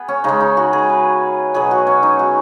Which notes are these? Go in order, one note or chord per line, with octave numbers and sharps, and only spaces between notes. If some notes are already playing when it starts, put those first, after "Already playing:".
Already playing: B3 G#4
C#4
C#3 G#3 D#4
D#4
F#4
G#4
B4
B2 F#3 G#4
F#4
C#4
D#4
F#4